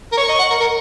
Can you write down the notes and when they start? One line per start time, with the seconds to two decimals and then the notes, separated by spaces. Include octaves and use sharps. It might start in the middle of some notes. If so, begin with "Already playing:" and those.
0.13 A#4
0.17 C#5 C#6
0.29 D#5
0.39 F#5
0.50 A#4
0.60 A#4